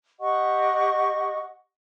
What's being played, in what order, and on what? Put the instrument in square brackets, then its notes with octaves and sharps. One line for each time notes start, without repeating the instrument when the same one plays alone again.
[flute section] G4 D#5 F#5 C#6